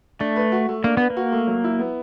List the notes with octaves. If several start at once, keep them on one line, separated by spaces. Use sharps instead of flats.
A3 D4
B4
F#4
A3
A#3 D4
B3 B4
A#3
F#4
A3
F#3
E4
B3